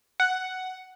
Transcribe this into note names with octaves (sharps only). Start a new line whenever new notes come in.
F#5